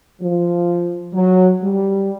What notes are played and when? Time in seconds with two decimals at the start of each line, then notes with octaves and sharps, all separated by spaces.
0.21 F3
1.14 F#3
1.63 G3